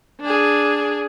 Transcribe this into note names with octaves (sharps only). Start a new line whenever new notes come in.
D4 G#4